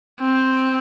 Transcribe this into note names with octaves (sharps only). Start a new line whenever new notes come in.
C4